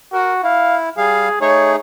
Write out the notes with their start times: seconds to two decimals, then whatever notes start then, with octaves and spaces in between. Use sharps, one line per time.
0.13 F#4 A#4
0.43 E4 F5
0.98 G3 G#4 F5
1.41 A3 D#4 G#4 C#5